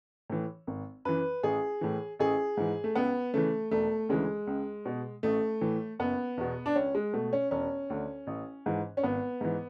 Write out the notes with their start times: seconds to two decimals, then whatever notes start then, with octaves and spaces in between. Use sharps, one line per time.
0.30 A2 E3
0.67 G#1
1.05 F#2 E3 B4
1.43 A1 G#4
1.81 A2 E3
2.19 A1 G#4
2.57 G#2 E3
2.84 A3
2.95 C#2 B3
3.34 C#3 E3 A3
3.71 E1 A3
4.09 D2 C#3 E3 G#3
4.47 C#2
4.86 B2
5.23 A1 A3
5.61 A2 E3
5.99 F#1 B3
6.38 E2 B2
6.66 D4
6.76 C#2 C#4
6.95 G#3
7.14 B2 A3
7.33 C#4
7.51 E1 C#4
7.90 D2 D3
8.27 A1
8.66 G#2 E3
8.97 C#4
9.03 G#1 B3
9.41 G#2 E3